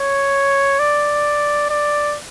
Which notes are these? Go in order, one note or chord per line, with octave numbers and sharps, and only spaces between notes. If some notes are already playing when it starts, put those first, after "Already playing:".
Already playing: C#5
D5
D5